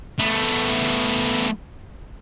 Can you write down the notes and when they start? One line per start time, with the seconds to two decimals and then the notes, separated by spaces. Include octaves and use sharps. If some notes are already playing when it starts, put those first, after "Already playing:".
0.19 A3 B3